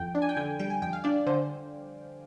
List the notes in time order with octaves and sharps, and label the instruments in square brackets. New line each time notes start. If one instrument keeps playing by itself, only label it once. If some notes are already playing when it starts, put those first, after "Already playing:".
Already playing: [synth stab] F2 G5
D4
G#5
G5
D3 G#5
G3 G5
G#5
F2 G5
F5
D4 D5
D3 C5